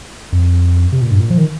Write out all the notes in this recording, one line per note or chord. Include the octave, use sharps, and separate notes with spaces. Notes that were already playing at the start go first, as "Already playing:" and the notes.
F2
C3
A#2
G2
A#2
F3
D#3